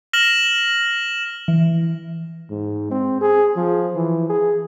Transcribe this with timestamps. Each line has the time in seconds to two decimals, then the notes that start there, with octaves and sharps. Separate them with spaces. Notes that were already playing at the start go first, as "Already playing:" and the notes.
0.13 F6 A#6 E7 F#7
1.48 E3
2.50 G#2
2.91 C4
3.21 G#4
3.56 F3
3.95 E3
4.30 G#4